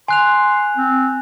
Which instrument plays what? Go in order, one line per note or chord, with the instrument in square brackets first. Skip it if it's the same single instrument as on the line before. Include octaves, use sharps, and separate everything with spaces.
[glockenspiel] G#5 F#6 F7 [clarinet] C6
[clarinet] C4